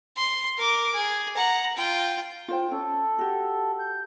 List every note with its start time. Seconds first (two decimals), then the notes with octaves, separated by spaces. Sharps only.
0.17 C6
0.58 A#4 D6
0.94 G#4
1.36 F#5 A#5
1.77 F4 G5
2.48 F4 C5 G5
2.71 C#4 A4
3.18 F#4 G4
3.79 G6